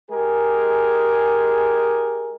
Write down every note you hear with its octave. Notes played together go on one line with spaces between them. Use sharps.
G#3 G4 G#4 A#4